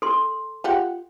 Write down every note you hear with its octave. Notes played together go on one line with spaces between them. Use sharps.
A4 C6
F4 G4 F#5